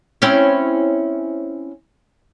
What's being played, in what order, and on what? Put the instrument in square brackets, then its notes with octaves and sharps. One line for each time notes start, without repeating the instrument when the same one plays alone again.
[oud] C4 C#4 E4